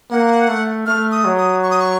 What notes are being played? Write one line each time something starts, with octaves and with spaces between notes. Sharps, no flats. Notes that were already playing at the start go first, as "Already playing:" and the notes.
A#3 F#5
A3
A3 F6
D#6
F#3
D#6
C#6
D#6
C#6